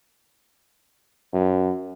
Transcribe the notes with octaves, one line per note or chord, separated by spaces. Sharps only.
F#2